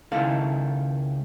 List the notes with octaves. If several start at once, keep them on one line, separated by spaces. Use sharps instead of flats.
C#2 D#3 E4 A4 F5